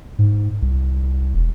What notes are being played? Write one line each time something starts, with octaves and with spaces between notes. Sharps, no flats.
G#2
C2
E1